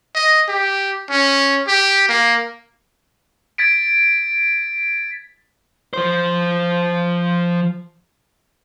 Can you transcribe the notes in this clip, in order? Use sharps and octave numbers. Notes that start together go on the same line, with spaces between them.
D#5
G4
C#4
G4
A#3
G#6 A6 B6 D7
F3 C5